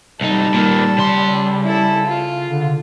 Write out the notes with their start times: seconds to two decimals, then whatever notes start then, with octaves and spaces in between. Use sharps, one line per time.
0.21 C2 G3 D#4 A4
0.54 A#2 D#3
0.98 C#3 C6
1.64 E4 A4
2.06 F4
2.45 D3